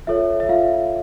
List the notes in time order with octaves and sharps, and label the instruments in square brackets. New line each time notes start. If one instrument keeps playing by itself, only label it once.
[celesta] F4 A4 C#5 E5
E5
F4 F5